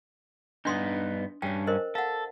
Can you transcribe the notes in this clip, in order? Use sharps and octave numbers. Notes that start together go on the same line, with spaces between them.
G2 B3 D4 D#4 C6 D#6
G2 C#4 C#5 G5
A#4 C5 D#5
A4 F5 F#5